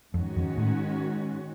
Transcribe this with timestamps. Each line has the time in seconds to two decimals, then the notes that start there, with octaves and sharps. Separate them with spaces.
0.14 F2 G#2 D#3 G#3 C#4 F#4
0.36 F2
0.57 A2